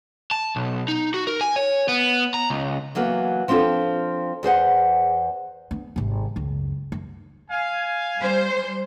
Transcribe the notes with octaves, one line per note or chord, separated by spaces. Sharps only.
A5
B1
D#4
F#4
A#4
G#5
C#5
B3
A#5
C#2
E3 F#3 A#3 B3
F3 C4 D4 F4 A4
E2 G#4 C5 F#5
B3 D4
G#1 C3
C#2 F#2
F#2
F5 G#5
G3 C5